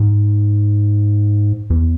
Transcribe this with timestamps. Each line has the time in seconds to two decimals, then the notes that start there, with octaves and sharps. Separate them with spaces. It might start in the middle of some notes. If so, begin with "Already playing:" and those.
Already playing: G#2
1.70 E2